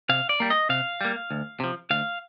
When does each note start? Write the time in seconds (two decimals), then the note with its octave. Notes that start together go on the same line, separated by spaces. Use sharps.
0.09 C3 F5
0.29 D5
0.40 G3 A#3
0.50 D#5
0.69 C3 F5
1.01 G3 A#3
1.31 D2
1.60 C3 F3
1.90 D2 F5